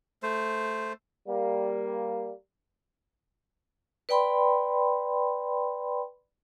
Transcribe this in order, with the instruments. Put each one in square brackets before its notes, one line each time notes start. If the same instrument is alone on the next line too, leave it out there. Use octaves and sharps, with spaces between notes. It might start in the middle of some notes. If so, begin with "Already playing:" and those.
[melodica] A3 C5
[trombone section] G3 A#3
[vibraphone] B4 D5 G5 B5 C6